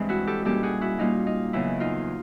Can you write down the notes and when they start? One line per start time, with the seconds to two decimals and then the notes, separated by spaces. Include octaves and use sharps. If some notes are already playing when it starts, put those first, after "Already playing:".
Already playing: G2 E3 G#3 C4
0.09 E4 F#4
0.27 G4 A4
0.45 A#2 G3 A#3 C#4 G4 A4
0.63 F#4 G#4
0.81 E4 F#4
0.98 A#2 G3 A#3 C#4 D#4 F4
1.27 D#4
1.53 E2 C#3 F#3 E4
1.80 D#4 F4